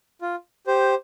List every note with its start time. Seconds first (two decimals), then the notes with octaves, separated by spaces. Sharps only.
0.22 F4
0.67 G4 C5